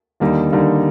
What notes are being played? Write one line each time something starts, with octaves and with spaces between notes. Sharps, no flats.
D#2 D3 G3 A#3 D#4
D#2 D3 G3 A#3 D#4